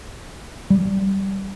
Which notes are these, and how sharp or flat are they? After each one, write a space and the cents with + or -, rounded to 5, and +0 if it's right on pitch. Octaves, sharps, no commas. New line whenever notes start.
G3 -15